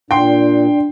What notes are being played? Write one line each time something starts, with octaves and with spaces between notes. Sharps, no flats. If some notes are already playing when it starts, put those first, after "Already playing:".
A#2 D4 G5 C6